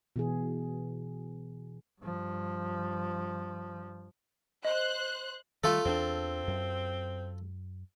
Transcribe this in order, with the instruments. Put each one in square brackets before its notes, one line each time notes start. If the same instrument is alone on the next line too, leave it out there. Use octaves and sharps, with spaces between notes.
[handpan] B2 E3 G#4
[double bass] G2 F3
[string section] C5 F#6 [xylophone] D#5
[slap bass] D#3 G3 [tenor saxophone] A3 [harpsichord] F4 A4
[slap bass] E2 D4 [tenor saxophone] C4
[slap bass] F#2